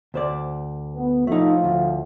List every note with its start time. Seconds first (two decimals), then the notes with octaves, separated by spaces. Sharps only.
0.14 D2 C5 D5
0.95 B3
1.27 A2 F3 A3 D#4
1.64 D2